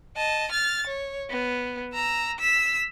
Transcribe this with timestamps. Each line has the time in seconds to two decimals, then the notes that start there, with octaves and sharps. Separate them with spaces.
0.17 D#5 A5
0.52 F6 A6
0.87 C#5
1.30 B3
1.94 A#5 E6
2.39 E6 B6